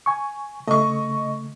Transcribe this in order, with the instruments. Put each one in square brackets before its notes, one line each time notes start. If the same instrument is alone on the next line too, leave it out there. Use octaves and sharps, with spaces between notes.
[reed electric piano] G#5 C#6
[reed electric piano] C#3 A3 [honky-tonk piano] D#5 C#6